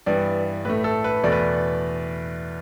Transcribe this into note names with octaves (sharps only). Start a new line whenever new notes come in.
G2 E3 B3 D5
A2 A3 B4
A4
B4
E2 B2 A3 D5
B4